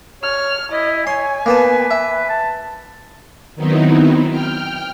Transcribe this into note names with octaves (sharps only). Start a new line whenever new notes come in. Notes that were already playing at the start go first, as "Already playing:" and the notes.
C#5 F6
E4 D#5
C#5 G#5 C6
A#3 B3 B4 A5
E5
A5
D#3 F#3 B3 C4 D#4 E4
G5 F6